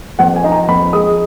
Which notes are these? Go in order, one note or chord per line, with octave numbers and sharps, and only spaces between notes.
F2 F#5
G#5
D#4
A#5
F2 B5
G#3 D#6